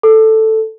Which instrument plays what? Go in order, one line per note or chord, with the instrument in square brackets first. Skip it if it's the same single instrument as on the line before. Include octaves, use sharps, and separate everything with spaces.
[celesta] A4